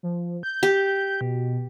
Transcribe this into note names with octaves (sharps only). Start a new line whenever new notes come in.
F3
G6
G4
B2